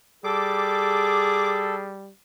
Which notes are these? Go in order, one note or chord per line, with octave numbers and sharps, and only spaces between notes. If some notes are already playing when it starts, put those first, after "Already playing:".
G3 G#4 A4 D6